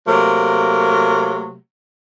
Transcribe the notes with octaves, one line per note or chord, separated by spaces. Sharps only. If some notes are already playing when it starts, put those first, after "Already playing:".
C3 F#3 A3 A#3